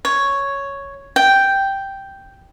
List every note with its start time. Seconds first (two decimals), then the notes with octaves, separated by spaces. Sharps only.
0.05 C#5
1.16 G5